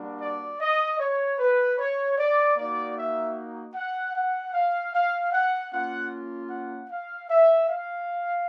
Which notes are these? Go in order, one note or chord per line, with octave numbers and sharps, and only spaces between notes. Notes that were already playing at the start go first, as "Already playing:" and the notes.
Already playing: G3 A#3 D4 F#4
D5
D#5
C#5
B4
C#5
D5
A#3 D#4 F#4 D5
E5
F#5
F#5
F5
F5
F#5
A#3 C#4 F4 F#5
F#5
F5
E5
F5